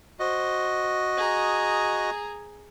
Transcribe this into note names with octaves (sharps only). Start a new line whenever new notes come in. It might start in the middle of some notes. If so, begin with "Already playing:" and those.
F#4 C5 D#5
G#4 A#5